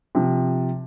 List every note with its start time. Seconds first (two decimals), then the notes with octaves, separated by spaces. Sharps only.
0.15 C3 F3